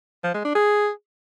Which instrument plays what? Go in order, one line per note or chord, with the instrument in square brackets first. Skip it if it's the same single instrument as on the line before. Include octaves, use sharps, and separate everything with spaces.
[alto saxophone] F3
G#3
D4
G#4